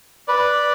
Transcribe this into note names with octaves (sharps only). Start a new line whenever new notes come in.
B4 D5